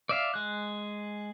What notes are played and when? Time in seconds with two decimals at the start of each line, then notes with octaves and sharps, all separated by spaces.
0.09 D5 E5 F5
0.34 G#3 F#6